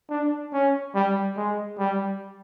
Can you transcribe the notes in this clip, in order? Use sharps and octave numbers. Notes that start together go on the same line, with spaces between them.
D4
C#4
G3
G#3
G3